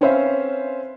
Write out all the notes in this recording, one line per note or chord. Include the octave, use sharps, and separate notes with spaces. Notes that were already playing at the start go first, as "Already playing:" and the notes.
C4 C#4 B4 C5 E5 F5